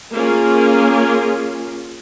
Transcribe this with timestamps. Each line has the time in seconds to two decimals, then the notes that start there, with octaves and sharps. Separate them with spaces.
0.13 A#3 C#4 F4 G#4